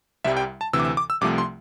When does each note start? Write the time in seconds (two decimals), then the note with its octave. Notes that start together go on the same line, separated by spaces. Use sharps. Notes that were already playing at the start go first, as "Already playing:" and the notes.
0.24 C2 C3 G3 E5
0.37 G5
0.61 A5
0.73 D2 C3 E3 E6
0.79 D6
0.85 E6
0.97 D6
1.10 E6
1.21 C2 C3 F3 A3 D6
1.38 C6